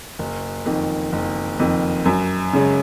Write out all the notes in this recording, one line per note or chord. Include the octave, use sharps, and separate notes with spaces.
F#1
F2 D#3
F#1
F2 D#3
F#2
C#3 G#3 C#4